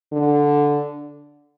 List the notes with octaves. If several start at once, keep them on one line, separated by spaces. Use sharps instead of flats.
D3